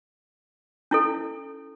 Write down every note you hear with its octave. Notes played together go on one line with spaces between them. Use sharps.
C#4 E4 A4